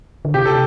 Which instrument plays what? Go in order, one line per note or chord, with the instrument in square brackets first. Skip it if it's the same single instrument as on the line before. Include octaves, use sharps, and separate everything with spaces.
[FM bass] D3
[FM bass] C3 [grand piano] G4
[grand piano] A4